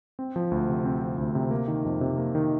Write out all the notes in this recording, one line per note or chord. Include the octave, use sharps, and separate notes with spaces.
C4
F3
D2
C3
C4
F3
D2
C3
A#3
D#3
F2
C3
A#3
D#3